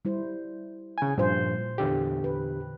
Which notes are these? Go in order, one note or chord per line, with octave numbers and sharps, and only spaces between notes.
G3 E4 C5
C#3 G#5
G2 A#2 F3 C5
E2 D3 G4
B4